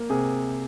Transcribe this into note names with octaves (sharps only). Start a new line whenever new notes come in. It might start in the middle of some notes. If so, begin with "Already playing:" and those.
Already playing: A#3
C3 G#4